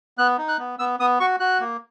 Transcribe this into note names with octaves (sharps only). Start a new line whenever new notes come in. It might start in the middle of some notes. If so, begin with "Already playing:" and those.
B3 F#6
D#4
F#6
B3
B3 E6
B3 D#6
F#4 C#6
F#4 F#6
A#3